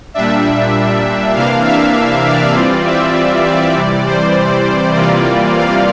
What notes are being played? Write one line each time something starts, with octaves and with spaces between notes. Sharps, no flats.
A#2 G3 D4 E5
C3 E3 A#3 D4 F5
E5
D5
E3 G3 C4 F4
E5
D5
C3 E3 G3
C5
C3 E3 G3 A#3 F4 D5
F5